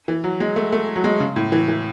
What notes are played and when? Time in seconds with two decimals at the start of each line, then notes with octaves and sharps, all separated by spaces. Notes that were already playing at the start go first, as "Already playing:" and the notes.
0.08 E3
0.24 F#3
0.40 G#3
0.56 A3
0.72 A3
0.96 F#3
1.04 G#3
1.20 C#3
1.36 A2
1.52 E3
1.68 E3